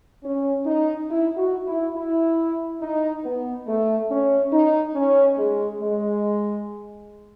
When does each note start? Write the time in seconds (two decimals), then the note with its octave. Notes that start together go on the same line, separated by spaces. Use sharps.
0.24 C#4
0.66 D#4
1.09 E4
1.37 F#4
1.67 E4
1.95 E4
2.81 D#4
3.24 B3
3.67 A3
4.10 C#4
4.52 D#4
4.95 C#4
5.38 G#3
5.81 G#3